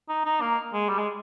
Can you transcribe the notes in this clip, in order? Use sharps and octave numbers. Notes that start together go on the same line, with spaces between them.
D#4
D#4
A#3
G#3
G3
G#3